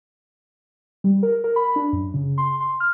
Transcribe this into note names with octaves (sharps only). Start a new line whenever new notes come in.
G3
A#4
A#4
B5
D4
F#2
C#3
C6
C6
F6